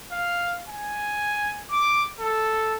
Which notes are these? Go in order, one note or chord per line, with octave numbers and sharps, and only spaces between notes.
F5
G#5
D6
A4